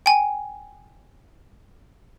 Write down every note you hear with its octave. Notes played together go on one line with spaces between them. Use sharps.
G5 G#5